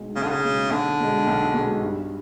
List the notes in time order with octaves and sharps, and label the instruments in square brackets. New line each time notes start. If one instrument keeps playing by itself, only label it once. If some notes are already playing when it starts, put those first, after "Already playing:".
Already playing: [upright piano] B1 B2 G#3
[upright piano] B1 [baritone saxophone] C#3
[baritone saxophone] D3
C#3
[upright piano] B2 G#3
[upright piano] B1 [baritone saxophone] D3
[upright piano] B2 G#3
B1
B2 G#3
G2